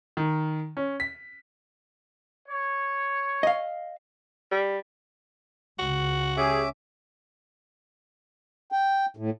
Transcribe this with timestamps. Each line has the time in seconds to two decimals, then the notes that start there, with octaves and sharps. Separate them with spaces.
0.17 D#3
0.77 C#4
1.00 B6
2.48 C#5
3.43 D#5 F5
4.52 G3
5.79 C#2 C#3 F#4
6.37 C#4 G4 G#4 E5 D6
8.72 G5
9.17 A2